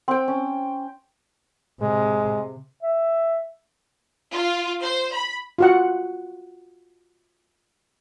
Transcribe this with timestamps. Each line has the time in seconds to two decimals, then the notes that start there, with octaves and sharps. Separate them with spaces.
0.08 C4 G5
0.28 C#4
1.81 C3 G#3
2.83 E5
4.33 F4
4.83 C5
5.12 B5
5.58 F4 F#4 F#5